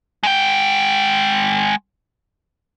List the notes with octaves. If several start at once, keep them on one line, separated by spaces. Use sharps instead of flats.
G#3 G5